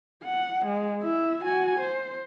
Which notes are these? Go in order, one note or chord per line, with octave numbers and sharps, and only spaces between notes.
F#5
G#3
E4 E5
F#4 G#5
C5